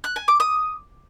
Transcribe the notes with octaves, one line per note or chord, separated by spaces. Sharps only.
F#6
G#5
D6
D#6